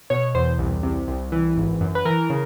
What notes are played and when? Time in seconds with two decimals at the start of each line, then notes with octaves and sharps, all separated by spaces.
0.10 B2 C#5
0.35 E2 C5
0.59 C2
0.83 C3
1.08 C2
1.32 E3
1.56 G#1
1.81 F#2
1.95 B4
2.05 E3 A#4
2.30 C#3